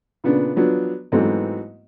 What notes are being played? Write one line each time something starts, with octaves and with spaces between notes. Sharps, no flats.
A#2 C#3 B3 D4
F3 F#3 B3 D4
G#2 E3 F#3 A3 B3 C4